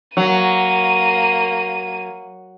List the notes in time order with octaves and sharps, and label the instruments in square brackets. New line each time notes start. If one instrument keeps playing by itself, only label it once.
[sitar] F#3 [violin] A#3 D#7